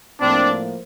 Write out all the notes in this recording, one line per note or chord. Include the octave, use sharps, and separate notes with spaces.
A2 F3 A#3 C4 D4